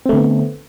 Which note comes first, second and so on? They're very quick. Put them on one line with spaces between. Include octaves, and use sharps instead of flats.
C4 A3 D3 B3